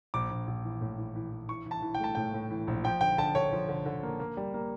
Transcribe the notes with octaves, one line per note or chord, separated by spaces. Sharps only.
A#1 D6
A#1
A#1
E3
A2
E3
E3
E3
E3 C#6
E3 A5
E3
G5
A3 A5
A2 G5
A2
E3
A#1
F3 G5
D3 G5
D3 A5
D3 C#5
F3
D3
D3
A#3
A#3
G3
A#3